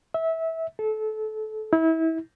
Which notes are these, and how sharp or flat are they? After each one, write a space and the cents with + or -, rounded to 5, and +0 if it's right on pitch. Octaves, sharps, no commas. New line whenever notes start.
E5 -20
A4 -25
E4 -30